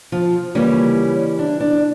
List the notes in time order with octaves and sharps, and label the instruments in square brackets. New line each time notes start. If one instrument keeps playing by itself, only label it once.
[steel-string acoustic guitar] F3 F4
C#3 E3 G3 A#3 C#4 E4
D4
D4